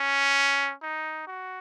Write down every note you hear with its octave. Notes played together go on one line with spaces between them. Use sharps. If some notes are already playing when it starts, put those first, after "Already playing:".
Already playing: C#4
D#4
F#4